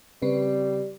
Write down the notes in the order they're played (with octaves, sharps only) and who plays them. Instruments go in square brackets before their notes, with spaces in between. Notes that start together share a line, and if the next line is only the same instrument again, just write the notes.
[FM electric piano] C#3 C4 B4 [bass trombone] G3